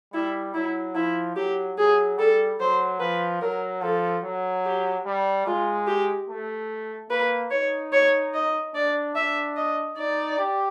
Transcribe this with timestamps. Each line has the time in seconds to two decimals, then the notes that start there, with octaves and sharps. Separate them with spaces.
0.13 G3 E4
0.54 F#3 E4
0.95 F3 E4
1.36 F#3 G4
1.78 F#3 G#4
2.18 G3 A4
2.60 F#3 C5
3.00 F3 B4
3.41 F#3 A#4
3.82 F3 A4
4.24 F#3
4.65 G4
5.06 G3
5.46 G#3 F4
5.87 G4
6.28 A3
7.10 A#3 B4
7.51 D#4 C#5
7.93 C#5
8.34 D#5
8.74 D4 D5
9.15 D4 E5
9.56 D#5
9.98 D#4 D5
10.39 G4